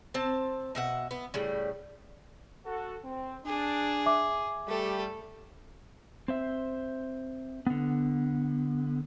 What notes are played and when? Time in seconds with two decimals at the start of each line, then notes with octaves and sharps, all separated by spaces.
0.14 C4 A5
0.75 B2 E5 F#5
1.11 B3
1.34 A2 C#3 G3
2.65 F#4 A4
3.04 C4
3.46 D4 G#4
4.06 E5 D6
4.68 G3 A3 A4
6.28 C4 C5 E5
7.67 D3 B3